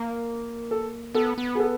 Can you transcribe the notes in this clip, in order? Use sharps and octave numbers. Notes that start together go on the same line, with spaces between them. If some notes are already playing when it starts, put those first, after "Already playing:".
Already playing: A#3
A4
B3 A4
B3
G#4
A4